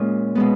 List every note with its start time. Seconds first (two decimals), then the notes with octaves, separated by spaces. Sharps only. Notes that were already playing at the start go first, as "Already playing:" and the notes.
Already playing: A#2 G#3 C#4 F4
0.35 B2 G#3 B3